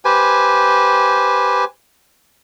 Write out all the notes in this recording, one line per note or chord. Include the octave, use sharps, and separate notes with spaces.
G4 B4 C5 G#5